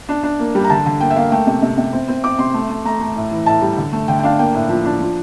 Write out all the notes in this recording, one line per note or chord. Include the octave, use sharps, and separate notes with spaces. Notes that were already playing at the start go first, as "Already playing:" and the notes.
D4
D4
A#3
G3
A#5
D3 A5
D3
A#3 G5
E5
A#3 F5
A3 G5
C3
C3
C3
C4
C4
C4 D6
C3 C6
A3
A3
A3 A#5
A3
A2
E3
A2 A5
G3
D3
A3
D3 G5
G5
D4 F5
A#3 G5
A2
F3
D4
F3